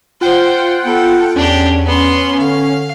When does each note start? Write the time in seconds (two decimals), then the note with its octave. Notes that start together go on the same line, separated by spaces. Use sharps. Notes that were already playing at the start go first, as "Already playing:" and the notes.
0.21 F4 C5 F#5 G5
0.86 B3 A4
1.36 E2 C#4 D4 G4
1.86 B3 C6
2.39 D3 F5